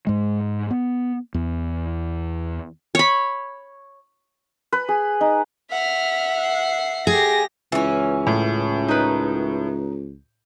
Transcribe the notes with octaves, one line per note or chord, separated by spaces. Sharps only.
G#2 G#3
B3
E2
C#5 B5
B4
G#4
D#4
E5 F#5 F6 B6
C7
G4 G#4 A#6
C#2 E3 C#4
A2
D#4 A#4 B4